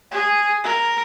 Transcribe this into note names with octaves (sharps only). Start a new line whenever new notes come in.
G#4
A#4